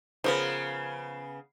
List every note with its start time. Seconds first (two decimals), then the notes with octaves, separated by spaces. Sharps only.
0.24 C#3 F3 B3 A#4 B4